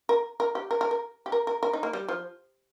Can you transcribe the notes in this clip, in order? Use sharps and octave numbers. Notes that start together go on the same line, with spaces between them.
A#4
A#4
G4
A#4
A#4
A#4
G4
A#4
A#4
A#4
D#4
A#3
G3
F3